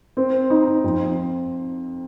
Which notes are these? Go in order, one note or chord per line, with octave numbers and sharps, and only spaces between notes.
C4
D#4
F2